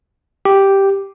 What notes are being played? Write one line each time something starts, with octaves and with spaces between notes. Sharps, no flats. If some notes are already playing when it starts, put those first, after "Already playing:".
G4